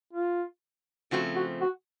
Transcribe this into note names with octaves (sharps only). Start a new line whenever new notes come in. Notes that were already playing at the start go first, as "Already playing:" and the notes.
F4
C#3 F3 A3 C4 F#4
F#4
F#4